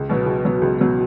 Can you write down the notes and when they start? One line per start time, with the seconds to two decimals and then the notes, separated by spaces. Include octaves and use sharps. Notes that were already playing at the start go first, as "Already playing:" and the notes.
Already playing: C#2
0.09 B2 F#3 B3
0.26 C#2
0.44 B2 F#3 B3
0.62 C#2
0.79 B2 F#3 B3